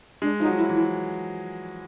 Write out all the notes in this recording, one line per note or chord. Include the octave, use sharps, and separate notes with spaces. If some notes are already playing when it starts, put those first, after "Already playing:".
G#3 D4
F3 D#4
F#3
E4
E3
E4